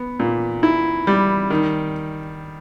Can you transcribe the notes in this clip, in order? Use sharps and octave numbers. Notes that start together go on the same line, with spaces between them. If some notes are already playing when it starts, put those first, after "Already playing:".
Already playing: B3
A#2
E4
G3
D#3